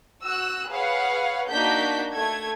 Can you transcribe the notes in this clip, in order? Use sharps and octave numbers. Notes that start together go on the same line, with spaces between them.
F#4 E6 F#6
G#4 B4 C#5 F5 F#5
A#3 D4 D#4 F#4 G6 B6
A3 A4 G#6